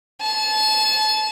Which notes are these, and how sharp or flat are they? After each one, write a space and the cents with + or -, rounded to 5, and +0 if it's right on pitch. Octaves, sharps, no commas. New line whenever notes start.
A5 -30